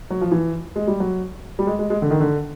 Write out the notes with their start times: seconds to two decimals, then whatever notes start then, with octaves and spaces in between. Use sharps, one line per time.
0.11 F#3
0.21 F3
0.32 E3
0.76 G#3
0.87 G3
1.00 F#3
1.59 G3
1.67 G#3
1.79 G#3
1.90 G#3
2.02 D3
2.10 D#3
2.20 D3